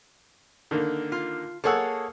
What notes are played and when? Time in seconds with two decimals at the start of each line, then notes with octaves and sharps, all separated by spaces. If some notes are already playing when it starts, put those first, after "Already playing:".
0.71 D3 D#3 A#3
1.12 F4
1.64 A#3 G#4 A4 C#5 F#5 E6